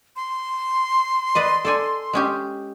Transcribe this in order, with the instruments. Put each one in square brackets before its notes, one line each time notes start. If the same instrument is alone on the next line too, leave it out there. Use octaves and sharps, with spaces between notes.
[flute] C6
[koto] B4 D5 D#5
A4 D5 G#5
G#3 C#4 G4